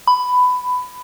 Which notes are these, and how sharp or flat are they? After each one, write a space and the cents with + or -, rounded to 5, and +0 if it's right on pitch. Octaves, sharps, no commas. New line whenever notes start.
B5 +15